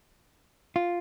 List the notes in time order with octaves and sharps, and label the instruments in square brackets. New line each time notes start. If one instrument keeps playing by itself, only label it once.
[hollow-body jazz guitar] F4